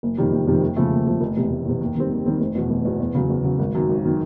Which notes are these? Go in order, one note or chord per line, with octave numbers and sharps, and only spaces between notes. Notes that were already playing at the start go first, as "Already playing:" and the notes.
F#1
F2 C3 D#3 G3
F#1
F2 C3 D#3 G3
D#2
C#3 F3 A3
D#2
C#3 F3 A3
F1
E2 C3
F1
E2 C3
D#2
D#3 G3 C4
D#2
D#3 G3 C4
F1
E2 B2
F1
E2 B2
E2
C#3 F#3
E2
C#3 F#3
G#1
F#2 D#3 F#3
G#1
D#3 F#3